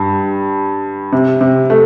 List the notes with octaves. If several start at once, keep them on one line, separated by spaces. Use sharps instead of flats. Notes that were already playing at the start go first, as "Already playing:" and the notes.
Already playing: G2
C3
C3
A3